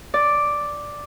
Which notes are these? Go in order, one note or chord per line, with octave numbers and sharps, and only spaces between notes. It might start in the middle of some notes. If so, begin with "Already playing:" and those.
D5